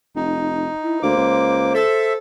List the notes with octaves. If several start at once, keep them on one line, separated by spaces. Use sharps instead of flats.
F1 D#4
E4
D2 A#3 C5 D6
C#2
A4 E5